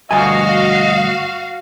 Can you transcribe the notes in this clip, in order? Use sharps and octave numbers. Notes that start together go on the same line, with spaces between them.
D2 G2 F#4 D#5 F5 G#5